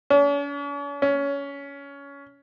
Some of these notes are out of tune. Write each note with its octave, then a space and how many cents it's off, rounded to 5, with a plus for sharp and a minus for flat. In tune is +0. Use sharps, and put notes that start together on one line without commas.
C#4 +45
C#4 +20